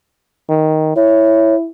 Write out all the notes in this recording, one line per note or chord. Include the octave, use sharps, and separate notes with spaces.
D#3
E4 C#5